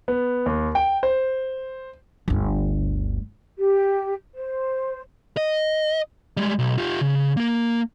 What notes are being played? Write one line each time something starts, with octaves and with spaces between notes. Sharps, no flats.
B3
D#2
G5
C5
G1 D2
G4
C5
D#5
G3 G#3
B1
F4 G4
C#3
A#3 A#4